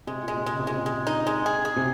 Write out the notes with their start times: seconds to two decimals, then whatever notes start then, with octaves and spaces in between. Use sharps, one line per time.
0.07 C3 G#3
0.23 A#2
0.28 G#3
0.37 C3
0.46 G#3
0.52 C#3
0.60 C3
0.67 A#2 G#3
0.76 C3
0.86 G#3
1.07 D#4
1.27 G#3
1.46 G#4
1.65 G#4
1.76 C3